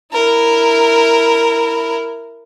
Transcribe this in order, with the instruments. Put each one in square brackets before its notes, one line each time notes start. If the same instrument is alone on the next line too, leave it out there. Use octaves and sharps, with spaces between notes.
[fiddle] E4 A#4